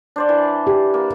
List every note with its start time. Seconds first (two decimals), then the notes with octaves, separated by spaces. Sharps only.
0.16 D4 C5 D5
0.29 E3
0.67 G4
0.94 A#3